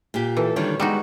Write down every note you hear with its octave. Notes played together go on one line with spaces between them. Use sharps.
A#2 G4
E3 A4
D3 D#3 G3 C#5
G3 G#3 B3 D#4 F#4